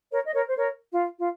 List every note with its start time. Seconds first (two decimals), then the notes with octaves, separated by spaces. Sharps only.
0.12 A#4 C#5
0.26 D#5
0.34 A#4 C#5
0.47 C5
0.57 A#4 C#5
0.93 F4
1.18 F4